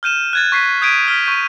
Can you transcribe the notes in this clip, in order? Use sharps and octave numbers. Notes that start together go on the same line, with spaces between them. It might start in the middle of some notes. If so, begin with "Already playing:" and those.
F6 G6 D#7 E7
F#6 G#6 A6
C#6 B6 C7
D#6 G6 G#6 B6 D7 D#7
F6 B6
C#6 G6 D#7